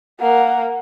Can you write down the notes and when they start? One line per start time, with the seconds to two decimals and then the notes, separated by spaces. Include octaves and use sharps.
0.20 A#3 F#5